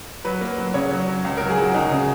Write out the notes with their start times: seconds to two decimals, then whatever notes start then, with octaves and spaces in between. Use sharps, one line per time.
0.25 F#3 B4
0.41 A#3
0.58 F#3
0.74 C#3 C#5
0.92 F#3
1.08 F#3
1.24 C#2
1.37 F#3 A#4
1.50 G#4
1.58 F#3 F#4
1.74 C#2 D#4
1.91 C#3